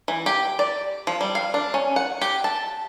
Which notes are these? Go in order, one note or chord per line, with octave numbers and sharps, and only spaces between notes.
E3
G4
D5
F3
G3
F5
D4
C#4
F#5
G4
A5